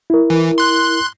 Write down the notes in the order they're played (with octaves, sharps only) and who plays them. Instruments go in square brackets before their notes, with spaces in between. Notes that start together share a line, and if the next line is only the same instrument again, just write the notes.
[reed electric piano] E4 A#4
[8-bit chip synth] E3
C6 F#6